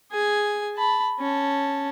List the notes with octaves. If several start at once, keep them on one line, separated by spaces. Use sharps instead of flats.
G#4 G#5
A5 B5
C#4 A5